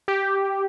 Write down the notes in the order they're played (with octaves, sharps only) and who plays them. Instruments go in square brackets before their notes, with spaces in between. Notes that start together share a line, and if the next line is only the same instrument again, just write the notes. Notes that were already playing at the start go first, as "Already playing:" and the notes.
[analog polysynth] G4